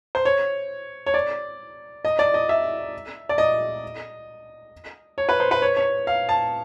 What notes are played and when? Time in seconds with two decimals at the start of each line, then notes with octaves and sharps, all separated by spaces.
0.15 C5
0.25 C#5
1.06 C#5
1.14 D5
2.05 D#5
2.19 D5
2.34 D#5
2.49 E5
3.29 D5
3.38 D#5
5.18 C#5
5.29 B4
5.40 C5
5.51 B4
5.62 C#5
5.77 C#5
6.07 F5
6.29 A5